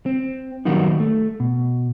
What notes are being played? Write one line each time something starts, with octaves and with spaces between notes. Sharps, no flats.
C4
D#3 F#3 G3 A#3 B3 D#4
A3
B2